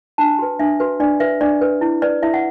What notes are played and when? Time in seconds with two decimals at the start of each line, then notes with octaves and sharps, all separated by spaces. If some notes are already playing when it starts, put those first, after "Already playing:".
0.18 D4 A5
0.39 F#4 B4
0.59 D4 E5
0.80 F#4 B4
1.00 D4 D5
1.20 B4 E5
1.41 D4 D5
1.61 B4
1.81 E4
2.02 B4 D5
2.23 E4 E5
2.34 F#5